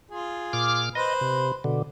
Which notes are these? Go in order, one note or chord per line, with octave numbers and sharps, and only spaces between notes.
F4 G#4
A#2 D6 F6
B4 C5 D#5
C3
B2 D3